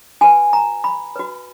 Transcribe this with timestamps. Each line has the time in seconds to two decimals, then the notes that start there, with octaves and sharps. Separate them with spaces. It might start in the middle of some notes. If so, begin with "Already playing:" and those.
0.21 F#4 B4 G#5
0.53 A#5
0.84 B5
1.16 F#4 B4